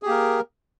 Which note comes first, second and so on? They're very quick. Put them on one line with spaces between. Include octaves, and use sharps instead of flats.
G#4 G4 A#3 A#4